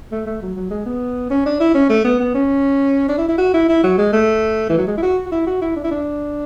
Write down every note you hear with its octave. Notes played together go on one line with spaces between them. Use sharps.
A3
A3
F#3
F#3
G#3
B3
C#4
D4
E4
C#4
A3
B3
B3
C#4
D4
E4
E4
F#4
E4
E4
F#3
G#3
A3
E3
F#3
G#3
E4
F#4
F#4
E4
F#4
E4
D4
E4
D4